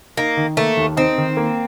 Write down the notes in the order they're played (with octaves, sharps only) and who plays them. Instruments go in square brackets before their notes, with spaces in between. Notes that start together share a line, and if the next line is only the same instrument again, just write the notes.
[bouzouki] A#3 [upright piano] D#4
[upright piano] D#3
[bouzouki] A3 [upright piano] A#3
[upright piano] D#2
[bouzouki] C4 [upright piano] D#4
[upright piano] D#3
A#3